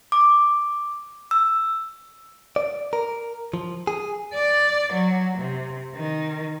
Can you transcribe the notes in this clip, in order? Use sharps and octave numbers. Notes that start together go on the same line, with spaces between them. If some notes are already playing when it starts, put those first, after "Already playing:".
D6
E6
D5
A#4
F3
G#4
D5
F#3
C3
D#3